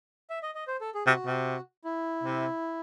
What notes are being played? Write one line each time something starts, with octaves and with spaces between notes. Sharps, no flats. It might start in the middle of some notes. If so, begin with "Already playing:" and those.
E5
D#5
D#5
C5
A4
G#4
C3 F#4
C3
E4
C3